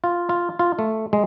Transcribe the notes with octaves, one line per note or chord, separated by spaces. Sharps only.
F4
F4
F4
A3
G#3